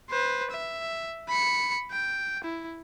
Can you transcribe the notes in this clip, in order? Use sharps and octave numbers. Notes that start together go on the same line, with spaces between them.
B4 C5
E5
B5 C#7
G5
E4